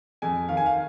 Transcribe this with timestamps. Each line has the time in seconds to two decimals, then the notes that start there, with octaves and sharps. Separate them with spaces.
0.22 F2 G#5
0.49 D#3 F5
0.57 G#5
0.66 F5